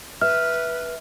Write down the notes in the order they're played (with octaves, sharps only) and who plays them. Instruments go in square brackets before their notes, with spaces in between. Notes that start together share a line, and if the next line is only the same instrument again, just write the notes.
[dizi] B4 [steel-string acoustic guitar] E5 [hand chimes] F6